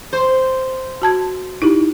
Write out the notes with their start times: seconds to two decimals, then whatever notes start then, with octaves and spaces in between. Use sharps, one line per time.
0.13 C5
1.02 F#4 A5 G#6
1.62 D#4 E4 G4